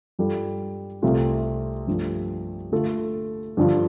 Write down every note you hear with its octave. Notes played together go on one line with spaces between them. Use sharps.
G2 G3 F4 A4
C2 C3 A3 F4
G2 F3 A3 D4
D3 A3 F4 A4
G2 D3 F3 D4 F4